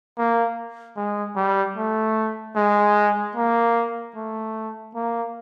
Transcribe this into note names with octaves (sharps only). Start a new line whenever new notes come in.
A#3
G#3
G3
A3
G#3
A#3
A3
A#3